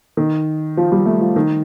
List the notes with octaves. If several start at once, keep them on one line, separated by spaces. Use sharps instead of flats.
D#3
F3
G3
A3
F3
D#3